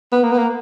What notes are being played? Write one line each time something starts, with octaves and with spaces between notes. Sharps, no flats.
B3
A#3
B3
A#3